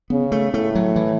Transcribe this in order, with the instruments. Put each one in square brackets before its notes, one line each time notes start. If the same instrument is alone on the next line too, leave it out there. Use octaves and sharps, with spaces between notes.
[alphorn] C#3 [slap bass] B3
[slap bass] A3
[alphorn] A2 [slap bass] A3
[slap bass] F#3
E3